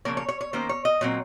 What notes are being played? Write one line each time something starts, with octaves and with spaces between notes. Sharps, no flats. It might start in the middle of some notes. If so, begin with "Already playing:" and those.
C#3 F3 A#3 C#5
C#5
C#5
C#5
D#3 A#3 C#4 C5
C#5
D#5
A#2 F#3 C4 C#5